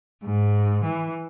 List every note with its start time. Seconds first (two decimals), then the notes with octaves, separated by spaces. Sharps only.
0.23 G#2
0.84 E3